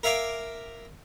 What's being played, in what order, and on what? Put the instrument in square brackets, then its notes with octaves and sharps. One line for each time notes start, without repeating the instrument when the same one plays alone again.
[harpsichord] A#4 E5 F5 G#5 D6